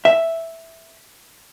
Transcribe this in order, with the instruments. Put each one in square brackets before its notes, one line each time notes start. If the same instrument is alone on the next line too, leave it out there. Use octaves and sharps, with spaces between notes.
[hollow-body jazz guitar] E5